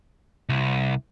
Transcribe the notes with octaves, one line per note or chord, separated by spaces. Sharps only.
C2